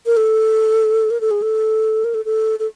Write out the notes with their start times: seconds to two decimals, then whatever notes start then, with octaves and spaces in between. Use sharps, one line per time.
0.06 A#4
0.17 A4
1.10 A#4
1.21 A4
1.31 G#4
1.42 A4
2.04 A#4
2.14 A4
2.25 A4
2.59 A4